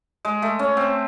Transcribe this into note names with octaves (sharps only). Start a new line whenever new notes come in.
G#3
A3
C#4
C4